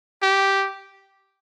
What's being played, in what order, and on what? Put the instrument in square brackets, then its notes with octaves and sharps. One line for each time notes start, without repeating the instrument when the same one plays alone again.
[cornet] G4